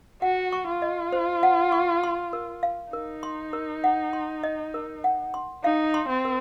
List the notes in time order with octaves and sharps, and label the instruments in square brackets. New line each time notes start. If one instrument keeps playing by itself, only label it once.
[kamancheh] F#4 [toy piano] F#5
[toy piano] C#6
[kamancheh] F4
[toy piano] D#5
C5
F#5
C#6
C6
A#4
F5
[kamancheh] D#4 [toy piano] A#4
[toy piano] C6
A#4
F#5
C6
D#5
A#4
F#5
C6
[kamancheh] D#4 [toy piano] F5
[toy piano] C6
[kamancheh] C4
[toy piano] A#4